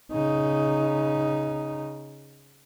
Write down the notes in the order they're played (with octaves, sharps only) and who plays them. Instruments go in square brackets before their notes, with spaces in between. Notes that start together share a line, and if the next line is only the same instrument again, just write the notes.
[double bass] C#3 D#4